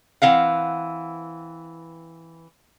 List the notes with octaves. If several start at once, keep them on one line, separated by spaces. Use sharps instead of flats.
E3 C4 F5 F#5